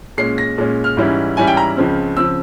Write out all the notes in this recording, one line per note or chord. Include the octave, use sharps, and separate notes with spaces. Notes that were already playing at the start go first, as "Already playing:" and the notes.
A#2 G#3 C#4 C7
A#6
A#2 G#3 C#4
F6
G#2 E3 G3 C#4 E4
G#2 E3 G3 C#4 E4 G#5
G5
A#5
C#2 C#3 F3 C4
C#3 F3 C4 E6